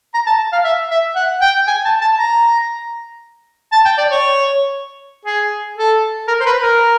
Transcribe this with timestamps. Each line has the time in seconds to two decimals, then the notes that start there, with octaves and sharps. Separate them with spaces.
0.14 A#5
0.27 A5
0.53 F5
0.64 E5
0.91 E5
1.16 F#5
1.42 G5
1.68 G#5
1.85 A5
2.02 A5
2.18 A#5
3.73 A5
3.86 G5
3.98 D5
4.11 C#5
5.26 G#4
5.77 A4
6.28 A#4
6.40 C5
6.46 B4
6.62 A#4